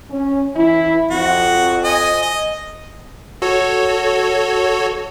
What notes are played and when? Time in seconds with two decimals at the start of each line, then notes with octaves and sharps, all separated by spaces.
0.10 C#4
0.55 E3 E4
1.11 F2 F#4
1.85 D#5 G#5
2.22 D#5
3.42 F#4 A4 C#5